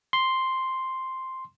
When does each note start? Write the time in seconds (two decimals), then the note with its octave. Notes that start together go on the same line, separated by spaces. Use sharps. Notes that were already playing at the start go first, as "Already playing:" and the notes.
0.13 C6